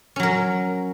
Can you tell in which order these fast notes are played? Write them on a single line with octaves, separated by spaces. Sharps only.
C#4 F#3 A#4